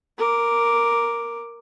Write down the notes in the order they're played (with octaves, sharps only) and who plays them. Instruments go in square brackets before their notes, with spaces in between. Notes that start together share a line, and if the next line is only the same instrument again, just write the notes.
[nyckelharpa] A#4 D6